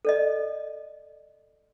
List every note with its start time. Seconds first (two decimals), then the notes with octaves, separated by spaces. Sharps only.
0.05 A4 D5 D#5